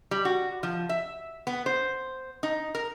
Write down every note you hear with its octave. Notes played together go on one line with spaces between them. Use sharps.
G3
F#4
F3
E5
B3
C5
D#4
A#4